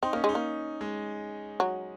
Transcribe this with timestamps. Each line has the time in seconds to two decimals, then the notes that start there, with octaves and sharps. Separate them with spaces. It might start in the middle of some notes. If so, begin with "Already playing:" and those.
0.02 C4 D#4
0.13 A#3 C#4
0.24 G#3
0.29 D#4
0.35 A#3
0.81 G#3
1.60 F#3